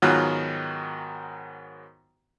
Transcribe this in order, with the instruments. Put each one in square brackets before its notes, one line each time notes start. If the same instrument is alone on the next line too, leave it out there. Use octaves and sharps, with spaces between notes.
[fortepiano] G#2 D#3 F#3 B3 F4 F#4